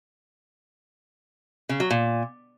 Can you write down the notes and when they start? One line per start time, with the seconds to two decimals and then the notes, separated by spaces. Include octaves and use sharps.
1.69 C#3
1.80 F#3
1.90 A#2